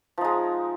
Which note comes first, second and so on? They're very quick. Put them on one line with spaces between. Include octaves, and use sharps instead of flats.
F3 D#4 G#3